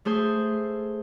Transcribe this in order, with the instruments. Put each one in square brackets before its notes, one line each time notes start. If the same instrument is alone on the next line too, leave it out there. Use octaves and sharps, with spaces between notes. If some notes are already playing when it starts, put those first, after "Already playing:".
[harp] A3 G#4 C5